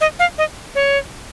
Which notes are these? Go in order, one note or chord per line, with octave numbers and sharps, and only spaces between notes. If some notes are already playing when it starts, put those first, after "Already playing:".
D#5
F5
D#5
C#5